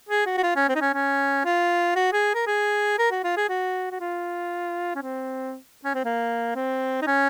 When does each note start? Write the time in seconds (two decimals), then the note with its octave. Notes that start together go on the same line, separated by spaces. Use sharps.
0.09 G#4
0.26 F#4
0.38 F#4
0.43 F4
0.56 C#4
0.69 C4
0.75 D#4
0.81 C#4
0.94 C#4
1.45 F4
1.96 F#4
2.13 G#4
2.35 A#4
2.47 G#4
2.99 A#4
3.11 F#4
3.24 F4
3.37 G#4
3.49 F#4
3.91 F#4
4.00 F4
4.95 C#4
5.02 C4
5.85 C#4
5.95 C4
6.05 A#3
6.55 C4
7.02 D#4
7.07 C#4